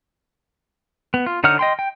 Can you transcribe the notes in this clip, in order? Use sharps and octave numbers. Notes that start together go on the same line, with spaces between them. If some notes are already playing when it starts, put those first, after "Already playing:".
B3
F4
D3 D#4 C#5 F#5 F6
D#5 G5 C6
G5